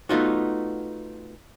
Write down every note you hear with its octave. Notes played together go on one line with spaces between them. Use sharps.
A3 B3 D#4 F4 F#4